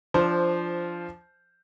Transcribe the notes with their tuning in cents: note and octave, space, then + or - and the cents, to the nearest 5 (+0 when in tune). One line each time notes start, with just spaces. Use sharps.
F3 -10 D4 +0 C5 +0